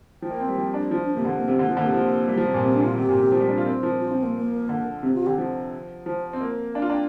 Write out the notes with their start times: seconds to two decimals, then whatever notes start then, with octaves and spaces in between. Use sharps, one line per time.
0.22 F3 G5
0.31 A#3
0.40 C4
0.48 G3
0.57 F3
0.74 D4
0.91 F3 F4
1.03 D4
1.14 C3 A#3
1.25 D3 C4
1.37 A#3
1.48 C3 C4
1.59 D3 A#3
1.69 F3 C4
1.77 D3 A#3
1.85 C3
1.94 F3 A#3
2.28 G3
2.37 F3
2.46 C3
2.54 A#2
2.63 C3 C4
2.74 D4
2.80 A#2
2.85 F4
2.97 C3 G4
3.09 A#2
3.20 C3
3.32 F3
3.40 G3
3.48 D4
3.57 F4
3.66 C4 A#4
3.83 F3
4.00 F4
4.11 C4
4.23 A#3
4.35 A#3
4.69 D3
5.03 C3 C4
5.15 F4
5.26 D3 G4
5.38 F3
6.06 F3 C5
6.33 C4
6.40 A#3
6.74 D4 F5
6.82 F4
6.90 D4 G5